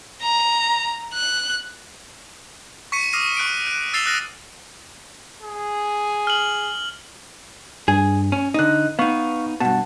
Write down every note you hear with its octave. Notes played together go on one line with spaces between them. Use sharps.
A#5
F#6
C#6 B6 C#7 D#7
D6 D#6 F6 A#6 C7 D#7
C#6 F#6 C#7 D7
F#6
E6 A6 C7 E7 F7 G7
D#6 F6 F#6 A6 A#6
G#4
F6 F#7
G2 G#4
C#4
D3 D#4 D#5 F#6
B3 D#4 F5 C#6
G2 B2 F#5 A5